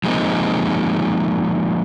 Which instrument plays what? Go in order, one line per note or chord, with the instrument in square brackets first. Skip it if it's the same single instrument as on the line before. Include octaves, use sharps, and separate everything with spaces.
[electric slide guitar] F3 G#3 A#3 C4 D#4